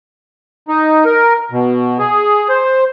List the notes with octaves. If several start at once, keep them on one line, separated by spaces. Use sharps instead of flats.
D#4
A#4
B2
G#4
C5